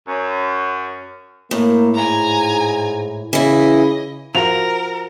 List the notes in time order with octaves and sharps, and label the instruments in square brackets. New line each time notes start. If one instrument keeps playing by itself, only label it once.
[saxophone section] F#2 C#4
[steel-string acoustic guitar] A2 [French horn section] A#3
[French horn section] G#2 [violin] G#5 A#5
[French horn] C#3 [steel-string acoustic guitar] E3 E4 [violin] D#5
[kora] F3 F#4 [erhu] A#4 [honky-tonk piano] F7